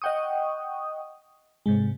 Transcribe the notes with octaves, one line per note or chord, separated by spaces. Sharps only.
D#5 F#5 G5 C#6 D#6
G#2 C3 G#3